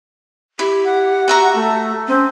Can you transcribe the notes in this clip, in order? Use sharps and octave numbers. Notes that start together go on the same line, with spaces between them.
E4 G4
F#5
F#4 E5 A#5
A3
C4 C#4